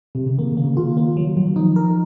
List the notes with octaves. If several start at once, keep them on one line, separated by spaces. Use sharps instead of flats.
C3
C#3
D#3 A#3
C#3
A#3
C#3
D#3 F4
A#3
F#3
F#3
D#3
F3 D#4
A#4